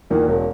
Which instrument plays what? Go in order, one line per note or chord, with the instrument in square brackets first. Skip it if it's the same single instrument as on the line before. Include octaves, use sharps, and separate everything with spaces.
[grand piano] E2 D#3 A#3 [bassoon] A#2
[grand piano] E1 [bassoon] F#2